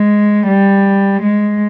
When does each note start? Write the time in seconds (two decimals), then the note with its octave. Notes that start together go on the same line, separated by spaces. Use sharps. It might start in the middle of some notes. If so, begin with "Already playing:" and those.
Already playing: G#3
0.48 G3
1.22 G#3